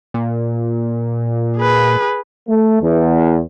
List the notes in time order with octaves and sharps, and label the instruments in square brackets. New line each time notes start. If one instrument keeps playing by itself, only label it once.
[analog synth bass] A#2
[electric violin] G#4 B4
[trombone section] A3
E2